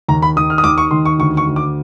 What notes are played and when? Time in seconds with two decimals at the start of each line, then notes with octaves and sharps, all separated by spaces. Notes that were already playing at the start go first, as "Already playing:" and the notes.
0.08 D#2 A#5
0.22 B5
0.36 D#3 D#6
0.50 F6
0.58 D#6
0.64 D#2 D6
0.78 C#6
0.91 D#3 C6
1.05 C#6
1.19 D2 C#6
1.37 C#6
1.47 D2
1.56 D6